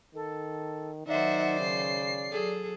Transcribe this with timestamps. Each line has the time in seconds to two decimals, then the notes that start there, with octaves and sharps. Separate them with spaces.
0.15 D#3 A4
1.07 D#3 F#3 D#4 C5 D5 E5 F#5
1.60 C#3 C7
2.32 F#3 G#4 A4